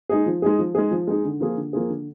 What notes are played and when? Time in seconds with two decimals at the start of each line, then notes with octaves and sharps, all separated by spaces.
0.09 G#3 D#4 G#4
0.26 F3
0.42 G#3 D#4 G#4
0.59 F3
0.75 G#3 D#4 G#4
0.91 F3
1.07 G#3 D#4 G#4
1.25 D3
1.40 F3 A#3 F4 G#4
1.57 D3
1.73 F3 A#3 F4 G#4
1.90 D3